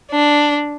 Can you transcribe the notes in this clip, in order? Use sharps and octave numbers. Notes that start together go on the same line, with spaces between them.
D4